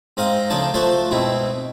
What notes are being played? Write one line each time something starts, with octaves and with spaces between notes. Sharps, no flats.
G#2 C4 D#5 F5 A#5 D#6
D2 C#3 F3 D#4 D5 A5
F3 A3 F#4 C5 A5 C6
G#2 B2 C4 E4